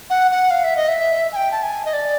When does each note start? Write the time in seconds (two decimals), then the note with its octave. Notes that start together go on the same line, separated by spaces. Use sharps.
0.10 F#5
0.31 F#5
0.51 F5
0.64 E5
0.76 D#5
0.88 E5
1.32 G#5
1.36 G5
1.51 A5
1.63 G#5
1.85 D#5
1.93 D5